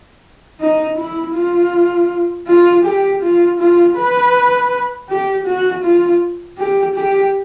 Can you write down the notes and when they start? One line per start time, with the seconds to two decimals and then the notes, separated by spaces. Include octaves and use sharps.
0.60 D#4
0.98 E4
1.35 F4
2.47 F4
2.84 G4
3.22 F4
3.60 F4
3.96 B4
5.09 G4
5.46 F#4
5.83 F4
6.58 G4
6.95 G4